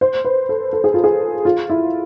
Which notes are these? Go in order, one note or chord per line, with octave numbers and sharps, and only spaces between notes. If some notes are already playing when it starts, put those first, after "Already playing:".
C5
B4
A4
A4
G#4
F4
G#4
F4
E4